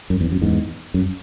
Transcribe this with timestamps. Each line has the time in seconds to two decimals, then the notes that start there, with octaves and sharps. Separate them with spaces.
0.10 F#2
0.21 E2
0.32 F#2
0.42 E2 G#2
0.94 F#2